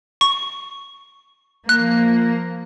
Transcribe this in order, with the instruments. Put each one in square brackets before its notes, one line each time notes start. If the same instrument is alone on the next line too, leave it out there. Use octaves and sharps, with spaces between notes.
[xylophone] C#6
[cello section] F3 A#3 [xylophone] F#6